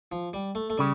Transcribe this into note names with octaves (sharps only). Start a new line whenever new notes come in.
F3
G3
A3
A3
C#3 G3